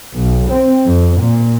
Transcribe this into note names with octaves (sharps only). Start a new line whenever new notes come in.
B1
C4
F2
A#2